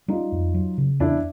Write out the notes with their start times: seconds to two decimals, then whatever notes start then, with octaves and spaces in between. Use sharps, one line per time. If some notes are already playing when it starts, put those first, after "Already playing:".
0.08 G3 D#4 F4
0.32 F2
0.54 F#3
0.78 C#3
1.00 E2 D4 E4